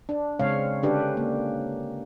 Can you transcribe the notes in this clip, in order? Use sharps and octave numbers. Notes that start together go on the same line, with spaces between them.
D4
C#3 G#3 C4 C#5 F5
D3 C#4 D4 G4 B4
A#3